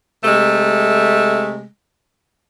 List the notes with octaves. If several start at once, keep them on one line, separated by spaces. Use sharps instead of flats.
C3 G#3 A3